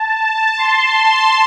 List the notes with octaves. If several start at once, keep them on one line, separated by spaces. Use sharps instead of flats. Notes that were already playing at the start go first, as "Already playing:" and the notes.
Already playing: A5
C6